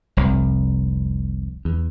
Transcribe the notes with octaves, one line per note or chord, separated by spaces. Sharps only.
F1 C2
E2